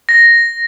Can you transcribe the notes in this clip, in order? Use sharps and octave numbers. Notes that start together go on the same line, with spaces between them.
A#6